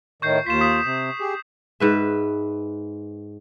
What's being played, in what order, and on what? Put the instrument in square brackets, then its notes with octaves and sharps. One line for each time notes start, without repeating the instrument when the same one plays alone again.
[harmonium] A2 D#3 [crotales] C#6 G6 C7
[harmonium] D#2 F4 [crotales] B6 E7
[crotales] D#6 B6
[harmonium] C3
G4 G#4
[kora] G#2 B4 E5